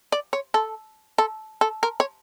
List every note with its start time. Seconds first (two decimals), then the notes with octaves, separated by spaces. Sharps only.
0.12 D5
0.33 C#5
0.54 A4
1.18 A4
1.61 A4
1.83 A#4
2.00 C#5